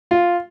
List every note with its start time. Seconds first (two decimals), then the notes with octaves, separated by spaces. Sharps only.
0.11 F4